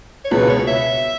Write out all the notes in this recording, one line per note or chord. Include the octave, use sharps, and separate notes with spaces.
C#5
C#2 B2 G#3 B4
C#5
E5